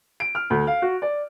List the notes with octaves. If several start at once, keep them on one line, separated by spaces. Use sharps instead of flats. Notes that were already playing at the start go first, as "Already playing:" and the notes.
D7
F6
D2
F5
F#4
D5